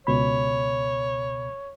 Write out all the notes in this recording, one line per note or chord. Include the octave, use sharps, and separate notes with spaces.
C#2 B2 C#5 B5